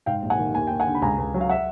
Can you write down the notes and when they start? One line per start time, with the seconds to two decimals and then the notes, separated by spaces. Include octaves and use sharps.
0.06 G#2 F5 G5
0.23 A#1
0.30 F#5 G#5
0.39 D#3
0.55 D#2 G#5
0.67 D#2 G5
0.80 F#5 G#5
0.87 D3
0.95 B5
1.02 C#2 G#5 A#5
1.18 C#2
1.34 F#3
1.41 F5
1.49 E5 F#5